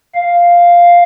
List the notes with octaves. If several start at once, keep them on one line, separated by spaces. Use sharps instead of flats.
F5